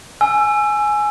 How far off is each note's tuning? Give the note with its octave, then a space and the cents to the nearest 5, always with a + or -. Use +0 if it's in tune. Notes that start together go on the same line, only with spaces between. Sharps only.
G#5 +10 E6 +20